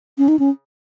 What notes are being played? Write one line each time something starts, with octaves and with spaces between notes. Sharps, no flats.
C#4
D#4
C#4